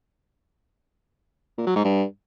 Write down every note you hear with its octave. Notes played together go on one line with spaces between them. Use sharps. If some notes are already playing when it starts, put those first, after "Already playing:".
A#2
F#3
G#2
G2